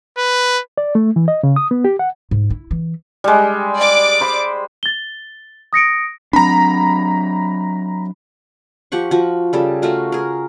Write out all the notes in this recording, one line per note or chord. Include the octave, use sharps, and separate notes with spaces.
B4
D5
A3
E3
D#5
C#3
D#6
B3
G4
F#5
G#2
E4
E3
G3 G#3
D5 D6
C5 B5
A6 G7
D#6 A#6 C#7 D7
F#3 C4 D4 A#5 B5
F3 G4 F#5 C#6
F3 F#4
C#3 G3 A4
A3 F4 F#4 A#4
G#4 A#4